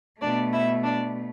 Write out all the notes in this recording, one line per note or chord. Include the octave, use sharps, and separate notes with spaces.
B2 A3 D4 D5
E4 E5
D4 D5